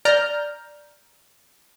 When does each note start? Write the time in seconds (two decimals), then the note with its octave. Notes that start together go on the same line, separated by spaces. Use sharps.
0.05 D5 A#5 F6 G6